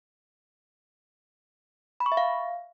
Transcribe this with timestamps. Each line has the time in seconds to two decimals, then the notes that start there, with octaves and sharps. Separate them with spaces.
2.00 B5
2.06 C#6
2.12 E5
2.17 F5